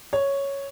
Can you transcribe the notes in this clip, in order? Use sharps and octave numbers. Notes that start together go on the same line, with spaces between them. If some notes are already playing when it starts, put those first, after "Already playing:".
C#5